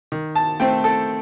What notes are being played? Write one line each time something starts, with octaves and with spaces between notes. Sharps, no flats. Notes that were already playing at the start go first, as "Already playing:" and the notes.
D#3
A5
A3 C4 G5
A4